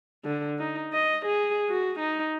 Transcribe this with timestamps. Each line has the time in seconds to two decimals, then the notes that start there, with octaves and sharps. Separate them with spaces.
0.25 D3
0.59 D#4
0.93 D#5
1.26 G#4
1.69 F#4
1.99 D#4